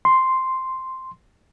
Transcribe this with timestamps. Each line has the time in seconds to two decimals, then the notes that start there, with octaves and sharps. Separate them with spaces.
0.05 C6